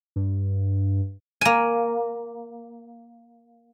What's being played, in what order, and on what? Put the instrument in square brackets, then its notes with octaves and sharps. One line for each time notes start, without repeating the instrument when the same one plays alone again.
[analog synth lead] G2
[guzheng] A#3 G#5